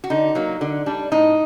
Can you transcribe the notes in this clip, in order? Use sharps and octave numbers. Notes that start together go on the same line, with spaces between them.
F#4
D3 D#4
F#3 A#3
D3
G3 D4
A2 D#4